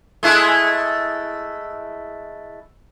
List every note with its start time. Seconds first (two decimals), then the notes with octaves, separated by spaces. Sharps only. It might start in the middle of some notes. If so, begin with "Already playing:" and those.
0.23 G#3 A3 E4